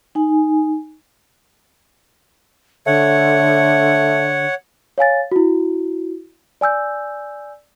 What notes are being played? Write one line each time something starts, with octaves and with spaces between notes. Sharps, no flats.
D#4 G#5
D3 A3 C#5 F#5
C#5 F5 G#5 A6
E4 F#4
D5 G#5 E6 G6